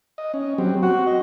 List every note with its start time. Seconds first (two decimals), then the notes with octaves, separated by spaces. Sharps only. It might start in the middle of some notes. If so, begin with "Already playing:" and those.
0.18 D#5
0.34 C#4
0.58 F#3 C4 G4
0.82 C4 F#4
1.06 D#5